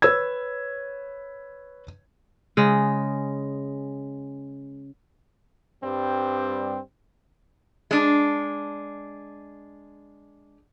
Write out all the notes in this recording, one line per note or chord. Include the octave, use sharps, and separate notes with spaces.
B4 C#5 E6 G#6
C#3 G#3
G2 G3 C4
G#3 D4